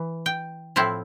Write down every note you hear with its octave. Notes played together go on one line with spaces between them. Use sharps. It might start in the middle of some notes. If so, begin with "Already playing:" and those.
Already playing: E3
G5
A2 F3 C4 E4